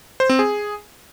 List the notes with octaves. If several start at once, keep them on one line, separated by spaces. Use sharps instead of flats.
C5
C4
G#4